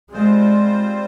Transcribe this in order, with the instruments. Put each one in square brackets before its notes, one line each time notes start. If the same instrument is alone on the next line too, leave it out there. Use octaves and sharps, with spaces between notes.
[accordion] G3 C4 F4 C5 [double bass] G#3